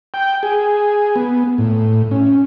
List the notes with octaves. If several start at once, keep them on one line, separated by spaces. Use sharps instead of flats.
G5
G#4
B3
A2
C#4